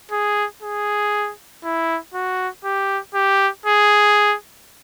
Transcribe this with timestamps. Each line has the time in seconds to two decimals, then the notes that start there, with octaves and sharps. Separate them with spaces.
0.11 G#4
0.62 G#4
1.64 E4
2.14 F#4
2.64 G4
3.14 G4
3.66 G#4